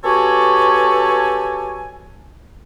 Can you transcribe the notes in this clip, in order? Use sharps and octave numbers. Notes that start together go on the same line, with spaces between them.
B3 F#4 G4 A4 C#5 G#5